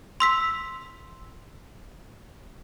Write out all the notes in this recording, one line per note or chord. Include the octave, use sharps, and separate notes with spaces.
C6 E6 B6